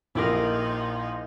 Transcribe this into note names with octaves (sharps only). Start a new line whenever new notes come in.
A#1 F3 D#4 E4 G4 A#4